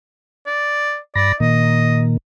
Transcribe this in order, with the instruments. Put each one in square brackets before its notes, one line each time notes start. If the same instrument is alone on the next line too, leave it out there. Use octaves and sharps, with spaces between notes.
[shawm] D5
[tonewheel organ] G2 B5 A#6 [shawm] D5
[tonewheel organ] A#2 D#3 A#3 [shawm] D#5